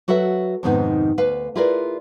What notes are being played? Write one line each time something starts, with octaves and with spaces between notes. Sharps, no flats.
F#3 F#4 A4 B4 E5
F2 G#2 C3 D#3 B3 D#4
D2 B4 F5
E4 F4 G#4 A#4 B4 D5